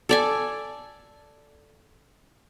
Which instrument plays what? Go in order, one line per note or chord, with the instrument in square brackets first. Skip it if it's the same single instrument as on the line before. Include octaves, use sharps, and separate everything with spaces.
[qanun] A4 D5 G#5